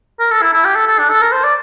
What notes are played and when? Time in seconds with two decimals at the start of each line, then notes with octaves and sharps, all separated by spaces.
0.19 A#4
0.31 A4
0.42 E4
0.53 E4
0.64 G4
0.75 A4
0.88 A4
0.99 D4
1.10 A4
1.21 A#4
1.32 C5
1.44 D5